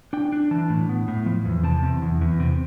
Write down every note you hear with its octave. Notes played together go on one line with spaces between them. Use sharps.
D4 G5
D4
E3 A5
A2
B3
A2
F3
E2
C3 A5
E2
E2
E2
C3